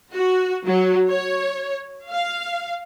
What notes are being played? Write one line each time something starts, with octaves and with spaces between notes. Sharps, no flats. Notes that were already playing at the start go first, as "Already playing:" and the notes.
F#4
F#3
C#5
F5